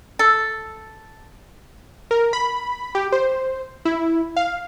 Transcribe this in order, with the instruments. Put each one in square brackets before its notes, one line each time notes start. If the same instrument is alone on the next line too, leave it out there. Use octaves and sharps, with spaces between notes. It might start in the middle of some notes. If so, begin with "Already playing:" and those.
[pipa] A4
[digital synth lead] A#4
B5
G4
C5
E4
F5